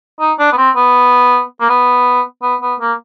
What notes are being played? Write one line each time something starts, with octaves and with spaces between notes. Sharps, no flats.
D#4
D4
B3
C4
B3
A#3
B3
B3
B3
A#3